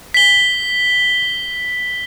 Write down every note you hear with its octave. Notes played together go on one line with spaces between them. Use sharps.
B6 G7